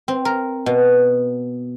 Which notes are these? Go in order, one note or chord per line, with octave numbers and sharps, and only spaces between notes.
C4
A#4
B2